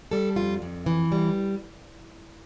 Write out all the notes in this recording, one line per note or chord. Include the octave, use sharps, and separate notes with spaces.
G3 A4
F2 F4
F2
E3
G3